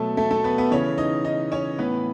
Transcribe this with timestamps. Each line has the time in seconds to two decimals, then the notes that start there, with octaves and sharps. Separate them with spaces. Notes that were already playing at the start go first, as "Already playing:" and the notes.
Already playing: B2 F#3 A3 A4
0.17 A3 A4
0.31 A3 A4
0.44 B3 B4
0.58 B3 B4
0.71 C#3 E3 C#4 C#5
0.98 D#4 D#5
1.24 D#4 D#5
1.52 C#4 C#5
1.79 A2 E3 B3 B4